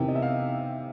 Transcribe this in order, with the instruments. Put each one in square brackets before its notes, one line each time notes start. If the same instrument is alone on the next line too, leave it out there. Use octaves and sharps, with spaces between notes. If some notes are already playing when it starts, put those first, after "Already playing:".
Already playing: [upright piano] E2 C3 D#3 G5
D#5
E5
F5